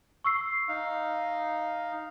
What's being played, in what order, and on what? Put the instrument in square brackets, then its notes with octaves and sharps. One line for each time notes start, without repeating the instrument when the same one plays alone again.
[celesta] C#6 E6 C7
[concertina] D#4 F5